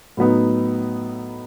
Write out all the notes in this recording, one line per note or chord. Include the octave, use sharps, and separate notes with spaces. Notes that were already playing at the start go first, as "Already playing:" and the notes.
A2 F#3 B3 D#4